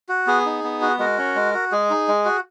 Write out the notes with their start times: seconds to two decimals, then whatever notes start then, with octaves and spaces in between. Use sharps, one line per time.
0.09 F#4
0.27 B3 G#4
0.46 D#4
0.64 B3
0.81 F#4
0.99 G#3 F#4 A#4
1.18 C#4
1.35 G#3
1.54 F#4
1.72 G#3 G#4
1.90 D#4
2.08 G#3
2.25 F#4